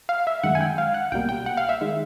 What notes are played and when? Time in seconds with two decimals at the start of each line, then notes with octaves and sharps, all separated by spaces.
0.09 F5
0.27 E5
0.43 F#2 D#3 G#3 F#5
0.55 G#5
0.61 G5
0.78 F5
0.94 F#5
1.12 C2 B2 G3 A#3 G5
1.29 G5
1.46 F#5
1.57 F5
1.69 E5
1.81 D#3 G#3